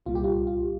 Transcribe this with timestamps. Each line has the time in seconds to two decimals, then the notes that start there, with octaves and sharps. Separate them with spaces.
0.06 C2 A#2 G3 F4
0.15 G4
0.24 F4
0.47 F4